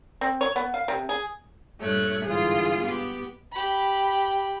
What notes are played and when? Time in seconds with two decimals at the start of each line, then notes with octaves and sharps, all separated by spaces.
0.21 C4
0.41 C#5
0.56 B3
0.74 F5
0.88 C3
1.09 G#4
1.81 G2 A#2 A3 C#5 F#6
2.24 G#2 D3 E3 F4 G#4
2.80 B3 G4
3.52 G4 B5